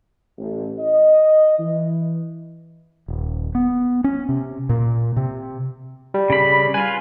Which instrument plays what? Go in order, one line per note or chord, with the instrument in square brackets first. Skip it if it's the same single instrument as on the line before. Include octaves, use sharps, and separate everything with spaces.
[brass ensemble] A1
D#5
E3
[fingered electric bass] D#1
B3
C#4
C3
A#2
C3
[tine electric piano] G3
[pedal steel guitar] C#3 B5
[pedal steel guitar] F4 B4 [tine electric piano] G#5